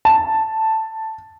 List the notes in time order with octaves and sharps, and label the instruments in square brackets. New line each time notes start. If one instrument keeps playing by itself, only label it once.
[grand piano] A5